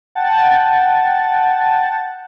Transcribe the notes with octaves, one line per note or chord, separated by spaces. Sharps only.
F#5 G5 A5 A6